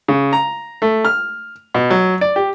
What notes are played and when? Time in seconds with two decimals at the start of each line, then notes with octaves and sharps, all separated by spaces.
0.08 C#3
0.33 A#5
0.82 A3
1.05 F6
1.74 B2
1.91 F#3
2.21 D5
2.36 G4